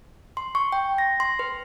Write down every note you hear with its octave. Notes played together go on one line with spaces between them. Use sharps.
C6
C#6
G5
A#6
C6
B4